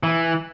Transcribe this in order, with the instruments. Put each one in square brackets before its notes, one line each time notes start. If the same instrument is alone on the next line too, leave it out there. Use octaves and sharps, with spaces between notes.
[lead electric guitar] E3